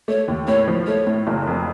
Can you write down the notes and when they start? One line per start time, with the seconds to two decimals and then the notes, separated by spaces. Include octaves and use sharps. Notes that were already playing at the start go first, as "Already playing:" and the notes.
0.08 A3 C#5
0.28 D#2
0.48 A2 C#5
0.68 F3
0.87 A3 C#5
1.07 A2
1.27 F#1
1.47 F2